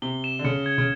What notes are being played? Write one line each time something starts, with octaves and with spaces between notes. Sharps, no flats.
C3 G7
E7
D3
C#3 C#7
G#6
C#3